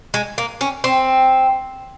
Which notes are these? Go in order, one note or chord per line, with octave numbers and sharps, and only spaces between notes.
G#3
A#3
C#4
C4